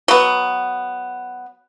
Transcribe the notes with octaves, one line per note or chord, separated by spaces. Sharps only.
F#3 B3